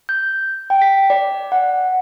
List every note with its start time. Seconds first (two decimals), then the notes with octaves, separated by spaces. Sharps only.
0.09 G6
0.70 G5
0.82 B6
1.10 D5
1.52 F#5